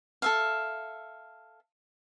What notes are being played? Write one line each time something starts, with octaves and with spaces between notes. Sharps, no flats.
A4 E5 F5